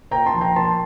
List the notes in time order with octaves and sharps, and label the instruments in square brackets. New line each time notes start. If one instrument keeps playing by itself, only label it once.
[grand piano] A#2 G5 A#5
A5 C6
F3
G5 A#5
A#2 A5 C6